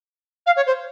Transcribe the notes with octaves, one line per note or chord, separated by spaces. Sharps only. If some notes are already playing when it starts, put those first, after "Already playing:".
F5
C#5
C5